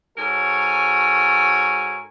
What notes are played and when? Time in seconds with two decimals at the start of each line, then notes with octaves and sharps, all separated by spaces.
0.18 G#2 F#4 A4 A#4 C#5 G#5